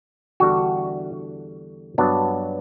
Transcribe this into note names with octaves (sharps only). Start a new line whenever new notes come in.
E2 D3 G3 D4 F#4
G2 F#3 B3 D4